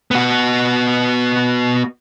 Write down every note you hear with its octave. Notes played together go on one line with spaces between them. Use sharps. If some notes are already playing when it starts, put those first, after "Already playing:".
B3 F#4